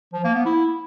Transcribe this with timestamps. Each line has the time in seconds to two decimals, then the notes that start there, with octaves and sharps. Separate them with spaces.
0.13 F3
0.24 A#3
0.35 B3
0.45 E4